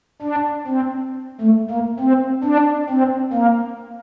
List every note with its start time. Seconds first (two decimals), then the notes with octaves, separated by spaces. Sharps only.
0.22 D4
0.67 C4
1.41 A3
1.70 A#3
2.00 C4
2.44 D4
2.90 C4
3.33 A#3